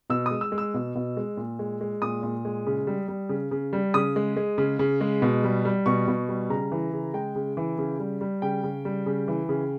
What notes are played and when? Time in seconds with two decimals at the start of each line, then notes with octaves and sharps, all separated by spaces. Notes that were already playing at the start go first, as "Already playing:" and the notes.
0.10 B2 E6
0.26 G#3 D#6
0.41 E6
0.52 G#3
0.58 E6
0.74 B2
0.95 B2
1.17 G#3
1.37 A#2
1.59 G#3
1.81 G#3
2.02 A#2 D#6
2.23 A#2
2.45 G#3
2.66 C#3
2.87 G3
3.08 G3
3.29 C#3
3.51 C#3
3.73 G3
3.94 C#3 D#6
4.16 G#3
4.36 G#3
4.58 C#3
4.79 C#3
5.01 G#3
5.22 B2
5.44 G3
5.65 G3
5.86 B2 C#6
6.08 B2
6.29 G3
6.50 C#3 A#5
6.72 E3
6.93 C#3
7.14 G#3 G5
7.36 C#3
7.57 E3
7.78 C#3
7.99 G3
8.21 G3
8.42 C#3 G5
8.64 C#3
8.85 G3
9.06 C#3
9.28 E3
9.49 C#3